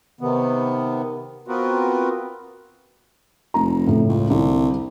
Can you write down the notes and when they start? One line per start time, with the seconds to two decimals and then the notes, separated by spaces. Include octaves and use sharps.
0.21 C3 D#3 B3
1.48 B3 C4 F4 F#4 A#4 B4
3.54 F1 A#5
3.87 A2 C#3
4.09 C#2
4.30 C2 D3 C4